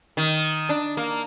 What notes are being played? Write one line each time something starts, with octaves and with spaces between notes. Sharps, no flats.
D#3
D4
A#3